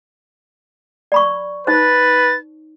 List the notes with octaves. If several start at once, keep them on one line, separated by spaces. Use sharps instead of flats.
D5 B5 C#6
D#4 B4 C5 A6